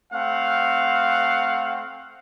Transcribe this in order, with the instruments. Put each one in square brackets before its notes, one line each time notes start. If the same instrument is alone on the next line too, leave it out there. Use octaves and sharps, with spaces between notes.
[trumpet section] A3 C4 F5 F#5